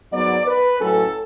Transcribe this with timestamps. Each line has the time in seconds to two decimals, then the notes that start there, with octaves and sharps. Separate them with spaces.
0.11 G#2 F#3 B3 D5
0.45 B4
0.79 A2 F#3 C#4 A4